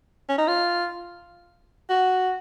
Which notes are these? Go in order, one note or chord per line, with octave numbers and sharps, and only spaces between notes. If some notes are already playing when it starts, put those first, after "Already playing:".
C#4
D#4
F4
F#4